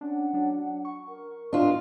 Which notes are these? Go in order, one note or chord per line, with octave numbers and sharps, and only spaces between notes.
C#4 D4 F#5
F#3 D4
C#6
A#4
D4 F4 D#5